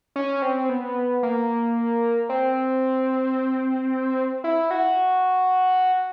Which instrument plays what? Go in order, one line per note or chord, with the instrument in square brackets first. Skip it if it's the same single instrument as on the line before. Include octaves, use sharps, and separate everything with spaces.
[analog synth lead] C#4
C4
B3
A#3
C4
E4
F#4